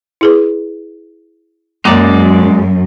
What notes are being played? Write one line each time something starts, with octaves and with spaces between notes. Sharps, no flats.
E4 G#4 B4
F#2 G#3 A#3 D5 A#5 D6